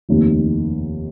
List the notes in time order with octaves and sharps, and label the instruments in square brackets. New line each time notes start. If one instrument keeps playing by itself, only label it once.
[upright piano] F1 D#2 D#3